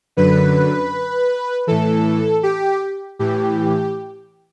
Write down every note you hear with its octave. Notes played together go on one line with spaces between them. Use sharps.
F#2 D3 B4
A2 E3 A4
G4
A2 E3 G4